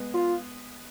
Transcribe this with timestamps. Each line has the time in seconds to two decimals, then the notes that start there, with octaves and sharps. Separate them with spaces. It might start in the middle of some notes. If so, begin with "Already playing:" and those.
Already playing: G#3 B3
0.14 F4